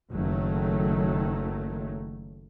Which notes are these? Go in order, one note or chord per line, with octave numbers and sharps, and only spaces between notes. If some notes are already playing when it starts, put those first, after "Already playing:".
F#1 D#3 F#3 A3